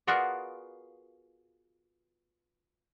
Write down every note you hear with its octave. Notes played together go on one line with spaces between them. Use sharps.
B3 F4 F#4 G#4 A#4 D5